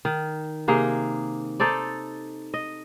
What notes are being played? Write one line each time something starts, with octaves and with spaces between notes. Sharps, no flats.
D#3
C3 A#3 D#4 G#4
D#4 A4 C5 D5
D#5